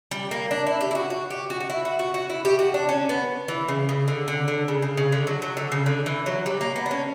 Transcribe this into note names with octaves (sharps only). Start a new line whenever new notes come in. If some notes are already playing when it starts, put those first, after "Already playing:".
G3
A#3
D4
E4
G4
E4
F#4
F#4
G4
F#4
F#4
E4
F#4
F#4
F#4
E4
G4
F#4
D4
C#4
B3
E3
C#3
C#3
D3
D3
D3
C#3
C#3
C#3
D3
F#3
F#3
D3
C#3
D3
E3
F#3
G3
A#3
B3
D4
C#4